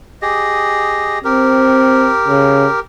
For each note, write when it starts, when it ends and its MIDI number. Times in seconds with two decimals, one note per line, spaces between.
0.22 1.19 67
0.22 1.19 68
0.22 1.19 75
1.24 2.11 60
1.24 2.80 67
1.24 2.80 70
2.28 2.67 49